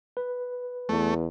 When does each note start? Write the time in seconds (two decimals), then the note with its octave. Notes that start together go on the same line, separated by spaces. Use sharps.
0.17 B4
0.89 E2 A3